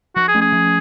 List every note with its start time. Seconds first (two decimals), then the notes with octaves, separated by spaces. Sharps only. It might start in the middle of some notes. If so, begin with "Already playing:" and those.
0.16 F3 F#4
0.28 G#4
0.35 A3 C#4
0.41 G#4
0.52 F3